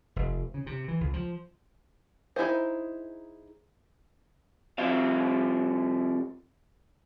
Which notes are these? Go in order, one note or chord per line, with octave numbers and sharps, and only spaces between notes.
F1
C#3
C3
E3
C#2
F3
D#4 E4 G#4 C5
C2 F3 G3 C4 E5 F5